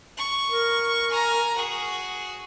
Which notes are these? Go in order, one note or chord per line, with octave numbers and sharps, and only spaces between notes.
C#6
A#4
G#5 A#5
F#4 G#4